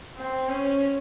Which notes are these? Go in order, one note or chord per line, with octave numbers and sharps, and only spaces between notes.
C4
C#4